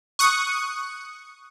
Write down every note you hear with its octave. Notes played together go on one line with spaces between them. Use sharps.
C#6 D#6 F#6 C#7